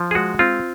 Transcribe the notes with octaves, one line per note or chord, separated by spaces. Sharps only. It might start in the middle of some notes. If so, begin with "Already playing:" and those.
Already playing: F3
G#4
G#3 F#4
C4 F4